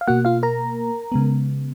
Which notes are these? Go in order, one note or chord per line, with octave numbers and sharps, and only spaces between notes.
F5
B2 A#3 F#4 F#5
F4 F5
A#4 A#5
C#3 G#3 B3